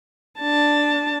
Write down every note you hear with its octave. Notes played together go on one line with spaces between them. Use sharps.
D4 A5